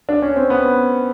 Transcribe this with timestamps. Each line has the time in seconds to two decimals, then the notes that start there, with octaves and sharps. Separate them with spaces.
0.09 D4
0.22 C#4
0.36 C4
0.50 B3